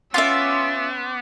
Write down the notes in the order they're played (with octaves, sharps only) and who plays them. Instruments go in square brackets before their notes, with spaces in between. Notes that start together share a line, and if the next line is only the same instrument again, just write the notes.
[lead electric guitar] B3 [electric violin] C#4 E6 [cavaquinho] F4 E5 [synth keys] C6 D6